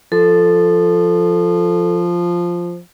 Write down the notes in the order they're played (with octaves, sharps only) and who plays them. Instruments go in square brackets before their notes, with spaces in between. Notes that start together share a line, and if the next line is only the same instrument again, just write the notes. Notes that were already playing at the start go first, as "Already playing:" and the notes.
[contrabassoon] F3 [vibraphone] A4